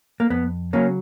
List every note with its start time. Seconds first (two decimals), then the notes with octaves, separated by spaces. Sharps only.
0.20 A#3
0.30 F2 B3
0.73 C#3 F#3 A#3 C#4